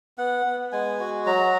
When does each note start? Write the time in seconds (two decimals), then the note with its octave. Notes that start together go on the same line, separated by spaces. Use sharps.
0.18 B3 F#5
0.46 B3
0.72 G#3 G#5
1.00 F#4
1.26 F#3 A#5